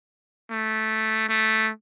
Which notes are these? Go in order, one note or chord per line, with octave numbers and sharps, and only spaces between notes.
A3
A3